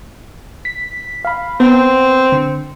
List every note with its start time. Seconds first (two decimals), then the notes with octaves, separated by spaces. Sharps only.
0.65 B6
1.25 F5 B5
1.60 B3 C4
2.32 D3